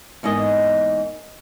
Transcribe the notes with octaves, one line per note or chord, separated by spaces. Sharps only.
E2 G#2 A#3 D#5